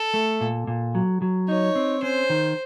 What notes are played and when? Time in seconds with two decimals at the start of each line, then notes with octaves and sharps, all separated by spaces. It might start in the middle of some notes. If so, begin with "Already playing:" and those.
Already playing: A4
0.14 A3
0.41 A#2
0.67 A#2
0.95 F#3
1.22 F#3
1.48 D#4 C#5
1.75 C4
2.03 C#4 C5
2.30 D#3